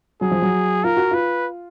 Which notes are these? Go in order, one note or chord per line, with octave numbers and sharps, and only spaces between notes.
F#3 G#4
F3
F#3
F4 A#4
F#4
F4 B4